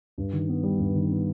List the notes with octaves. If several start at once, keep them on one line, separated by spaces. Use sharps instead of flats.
G2
D#3
B3
G3
G2
D#3
B3